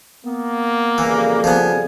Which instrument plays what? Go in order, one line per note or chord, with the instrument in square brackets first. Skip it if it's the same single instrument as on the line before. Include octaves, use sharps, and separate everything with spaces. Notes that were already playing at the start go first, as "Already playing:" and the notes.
[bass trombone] A#3 [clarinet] B3
[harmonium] F2 C#3 G3 [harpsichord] E3
[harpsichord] F3 B3 [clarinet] G#5